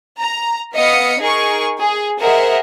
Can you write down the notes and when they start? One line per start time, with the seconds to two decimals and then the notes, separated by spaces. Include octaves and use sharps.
0.19 A#5
0.75 B3 D#5 F5 D#6 B6 C#7
1.20 D#4 G#4 A#4 G#5 C#6
1.78 G#4
2.20 G#4 A#4 C5 D#5 E5 F#5